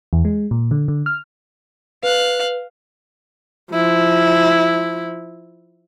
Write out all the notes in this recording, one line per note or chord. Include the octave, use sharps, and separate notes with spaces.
E2
G#3
A#2
D3
D3
F6
B4 F5 F#6
F3 E4